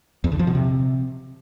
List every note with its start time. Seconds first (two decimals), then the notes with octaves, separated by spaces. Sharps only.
0.24 E2
0.32 D3
0.39 F3
0.47 B2
0.55 C3